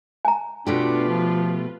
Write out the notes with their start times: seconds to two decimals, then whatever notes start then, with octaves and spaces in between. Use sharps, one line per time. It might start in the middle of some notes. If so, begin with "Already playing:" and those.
0.25 G#5 A#5
0.67 B2 A3 D4 F4 G4 B4
1.08 F3